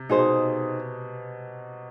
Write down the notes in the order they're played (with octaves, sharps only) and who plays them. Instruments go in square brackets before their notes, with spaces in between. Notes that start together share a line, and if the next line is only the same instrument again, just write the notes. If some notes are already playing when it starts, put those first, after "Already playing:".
Already playing: [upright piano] C3
[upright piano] B2 [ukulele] D#4 G#4 C5